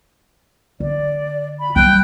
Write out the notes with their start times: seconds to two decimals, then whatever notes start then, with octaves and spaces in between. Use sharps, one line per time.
0.80 D3 D5
1.59 B5
1.76 F#3 G3 G5 F#6